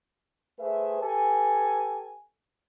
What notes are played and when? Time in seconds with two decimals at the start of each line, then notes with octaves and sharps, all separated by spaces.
0.59 A3 G#4 B4 C5 E5
1.01 G4 A4 B4 G#5